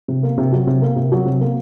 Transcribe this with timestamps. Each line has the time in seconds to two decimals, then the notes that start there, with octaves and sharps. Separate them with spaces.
0.08 C3
0.23 A#3
0.38 C3
0.52 F#3
0.67 C3
0.82 A#3
0.96 C3
1.12 F#3
1.26 C3
1.41 A#3